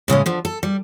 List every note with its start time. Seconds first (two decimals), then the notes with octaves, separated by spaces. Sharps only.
0.08 A2 C#3 G#3 C#4
0.26 D3 F3
0.45 A4
0.63 G3